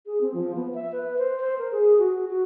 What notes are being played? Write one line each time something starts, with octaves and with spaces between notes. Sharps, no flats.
G#4
C4
F3
B3
E5
B4
C5
C5
A#4
G#4
F#4
F#4